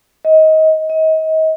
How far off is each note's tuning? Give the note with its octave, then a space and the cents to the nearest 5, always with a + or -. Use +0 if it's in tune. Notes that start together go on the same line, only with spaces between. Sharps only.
D#5 +25
D#5 +35